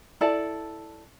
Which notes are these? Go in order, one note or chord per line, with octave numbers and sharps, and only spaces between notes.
E4 A4 D5 A5